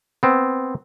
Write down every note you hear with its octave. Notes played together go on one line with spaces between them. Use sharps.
B3 C4